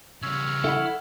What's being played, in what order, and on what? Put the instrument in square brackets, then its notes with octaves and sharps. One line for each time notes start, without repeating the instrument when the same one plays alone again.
[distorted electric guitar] C#3 G3 [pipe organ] C#5 E6 F6
[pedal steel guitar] E4 B5 [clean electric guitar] A4 F#5